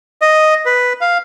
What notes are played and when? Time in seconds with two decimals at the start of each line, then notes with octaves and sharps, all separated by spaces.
0.22 D#5
0.66 B4
1.01 F5